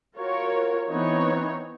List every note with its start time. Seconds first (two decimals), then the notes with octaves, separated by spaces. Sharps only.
0.16 F4 F#4 A#4 C#5
0.89 E3 B3 C4 D#4 C#5